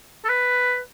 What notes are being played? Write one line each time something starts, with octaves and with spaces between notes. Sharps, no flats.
A4
B4